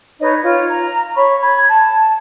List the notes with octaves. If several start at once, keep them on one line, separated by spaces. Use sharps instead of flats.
D#4 B4 C#5 D#5
F4 C#5
A#5
C#5 B5 C#6
B5 G#6
A5